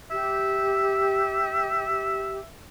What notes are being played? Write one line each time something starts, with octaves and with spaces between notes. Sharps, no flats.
G4 E5